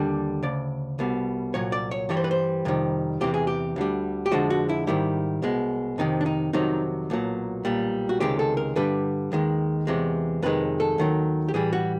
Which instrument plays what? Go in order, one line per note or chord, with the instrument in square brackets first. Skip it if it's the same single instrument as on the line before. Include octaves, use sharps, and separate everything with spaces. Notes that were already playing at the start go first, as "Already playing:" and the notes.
Already playing: [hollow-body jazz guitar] D#2 D3 G3
D2 C#3 D5
C2 B2 G3
C2 A#2 F#3 C#5
D5
C#5
G2 E3 G3 C#5
C5
B4
C5
F2 C3 D#3 G3
E2 C3 E3 G4
G#4
G4
D2 D3 G3
G4
F2 D3 F3 G#3 F#4
F#4
E4
G#2 D#3 G3 E4
C2 B2 G#3
F2 C3 D#3 D#4
D4
D#4
F2 C3 D#3 F#3 D#4
B1 A#2 F#3
B1 A#2 G3
F#4
C#2 C3 D#3 G#3 G4
A4
A#4
G2 D3 G3 B4
D#2 D#3 G#3
E2 C3 E3 G#3
F2 C3 D#3 G#3 B4
A4
D#2 D#3 F#3
G4
A2 E3 G3 G#4
F#4